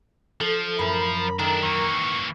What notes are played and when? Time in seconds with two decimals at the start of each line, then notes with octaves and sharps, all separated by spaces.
0.41 F3 A4
0.79 F#2 A2 E3 A#4 A#5 B5
1.39 D#3 D4 E4 A4
1.63 E3 A#3 C#6